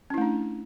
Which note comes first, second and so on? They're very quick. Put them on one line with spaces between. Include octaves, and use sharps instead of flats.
C#4 E4 A3 D4